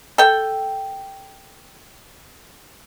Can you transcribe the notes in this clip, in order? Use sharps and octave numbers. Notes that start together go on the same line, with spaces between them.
A4 G5